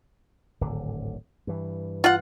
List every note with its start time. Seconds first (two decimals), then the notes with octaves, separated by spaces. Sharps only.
0.61 D1 G#1 D3
1.47 G2 E3
2.04 F4 F#5